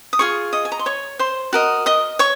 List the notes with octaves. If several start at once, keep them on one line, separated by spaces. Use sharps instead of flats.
D#6
F4 G#4 C#6
D#5 D#6
G#5
A#5
C6
C#5 C#6
C5 C6
F#4 A#4 D#5
D#5 D#6
C#5 C#6